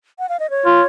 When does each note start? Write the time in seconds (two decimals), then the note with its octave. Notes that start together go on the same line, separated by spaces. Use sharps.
0.19 F#5
0.29 F5
0.40 D#5
0.50 C#5
0.65 F4